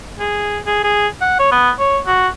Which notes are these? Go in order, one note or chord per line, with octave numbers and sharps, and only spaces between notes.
G#4
G#4
G#4
F#5
C#5
B3
C#5
F#4